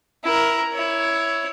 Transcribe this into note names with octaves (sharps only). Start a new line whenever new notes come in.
E4 A#4
E4 C#5